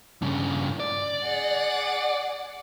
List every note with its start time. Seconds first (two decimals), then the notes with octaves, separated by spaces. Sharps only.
0.22 G2 C#3
0.80 D5
1.24 G#4 F#5